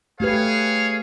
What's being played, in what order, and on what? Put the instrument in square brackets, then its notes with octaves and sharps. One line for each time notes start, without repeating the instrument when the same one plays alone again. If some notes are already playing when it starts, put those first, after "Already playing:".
[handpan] A3 G4 B4 [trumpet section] G#4 C#5 F5